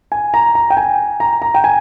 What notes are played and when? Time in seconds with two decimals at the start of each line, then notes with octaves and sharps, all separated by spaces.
0.12 G#5
0.34 A#5
0.55 A#5
0.70 G5
0.77 G#5
1.20 A#5
1.42 A#5
1.55 G5
1.64 G#5